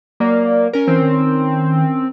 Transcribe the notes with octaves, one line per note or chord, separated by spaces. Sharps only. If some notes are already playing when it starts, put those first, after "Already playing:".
F#3 A#3 D5
C#4 A#4
E3 C4
D#3